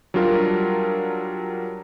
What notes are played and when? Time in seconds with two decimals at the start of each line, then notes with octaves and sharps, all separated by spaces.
0.14 F#3 G3 D4 F4 A#4